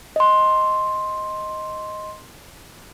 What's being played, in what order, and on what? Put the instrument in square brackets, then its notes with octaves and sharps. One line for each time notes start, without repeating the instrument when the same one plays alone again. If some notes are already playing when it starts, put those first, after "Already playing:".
[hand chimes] D#5 C6